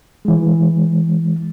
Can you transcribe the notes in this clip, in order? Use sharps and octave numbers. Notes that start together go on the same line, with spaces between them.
E3 G#3